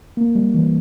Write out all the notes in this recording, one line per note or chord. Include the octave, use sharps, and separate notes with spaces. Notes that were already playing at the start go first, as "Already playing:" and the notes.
A#3
G3
E3